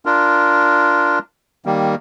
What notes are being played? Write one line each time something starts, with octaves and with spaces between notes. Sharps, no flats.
D4 F4 A#4
D#3 G3 A#3